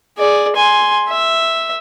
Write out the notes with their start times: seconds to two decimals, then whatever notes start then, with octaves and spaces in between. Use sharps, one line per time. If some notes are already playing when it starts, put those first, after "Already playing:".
0.17 G#4 D5
0.56 G#5 C6
1.09 E5